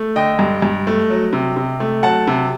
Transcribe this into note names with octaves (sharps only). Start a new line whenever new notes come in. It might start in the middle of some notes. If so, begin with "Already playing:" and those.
Already playing: A3
D3 D#5 G5
G2
G2
A3
F#3
C3
C3
A3
F#3 F#5 A5
C3